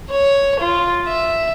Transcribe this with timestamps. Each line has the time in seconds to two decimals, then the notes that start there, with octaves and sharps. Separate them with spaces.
0.11 C#5
0.60 F4
1.07 E5